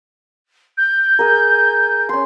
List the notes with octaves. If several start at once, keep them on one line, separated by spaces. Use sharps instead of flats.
G6
G#4 A#4
C#4 C6